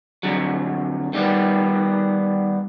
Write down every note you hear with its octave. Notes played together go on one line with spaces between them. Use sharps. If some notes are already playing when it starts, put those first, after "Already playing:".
F2 A#2 D3 F#3
D#3 G3 B3